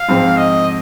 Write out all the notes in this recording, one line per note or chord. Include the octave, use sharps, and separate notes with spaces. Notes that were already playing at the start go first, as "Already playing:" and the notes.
Already playing: F5
G#2 F3 C4
D#5